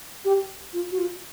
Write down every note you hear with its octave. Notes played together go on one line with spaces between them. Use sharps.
G4
F4
F#4
F4